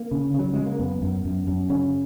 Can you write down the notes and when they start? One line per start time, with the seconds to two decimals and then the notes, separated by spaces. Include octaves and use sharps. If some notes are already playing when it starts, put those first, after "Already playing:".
Already playing: A#3
0.11 C#3
0.34 C#3
0.39 F#3
0.53 C#3 G#3
0.66 A#3
0.79 F#2 B3
1.02 F#2
1.25 F#2
1.47 F#2
1.70 C#3 C#4